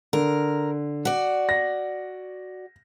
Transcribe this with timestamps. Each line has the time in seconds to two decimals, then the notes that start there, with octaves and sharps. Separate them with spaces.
0.13 D3 A#4
1.05 F#4 D5
1.49 A#6